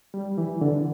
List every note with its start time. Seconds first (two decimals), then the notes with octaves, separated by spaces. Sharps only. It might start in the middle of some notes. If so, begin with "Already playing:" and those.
0.14 G3
0.38 E3
0.61 D3